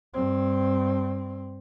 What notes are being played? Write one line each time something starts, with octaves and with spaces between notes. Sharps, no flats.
G2 C4